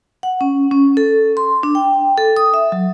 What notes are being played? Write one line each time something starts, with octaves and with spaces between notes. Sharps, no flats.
F#5
C#4
C#4
A4
C6
D4
G5
A4
D#6
E5
F#3